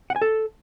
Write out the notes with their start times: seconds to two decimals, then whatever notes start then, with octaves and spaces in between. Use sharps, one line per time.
0.10 F#5
0.16 G#5
0.22 A4